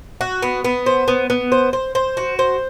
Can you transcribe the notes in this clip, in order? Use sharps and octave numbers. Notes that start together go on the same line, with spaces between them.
F#4
B3
B3
C5
B3
B3
C5
C5
C5
F#4
C5